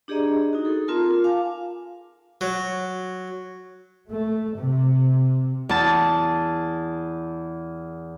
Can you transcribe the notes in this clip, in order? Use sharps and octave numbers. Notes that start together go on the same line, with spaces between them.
D4 G4 G#4 D5 D#5 A#5
D#4 F#4
G#4 A4
C4 F4 A#4 A5 A#5
F4
F5 G#5 A5 D6
F#3
A3
C3
E2 A5